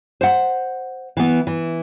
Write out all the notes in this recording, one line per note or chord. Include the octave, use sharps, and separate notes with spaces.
C5 F#5
E3 B3
E3